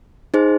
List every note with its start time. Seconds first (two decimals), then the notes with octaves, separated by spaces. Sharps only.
0.34 D#4 G#4 C5